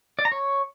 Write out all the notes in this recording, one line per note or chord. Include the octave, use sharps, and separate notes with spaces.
D5
A#5
C#5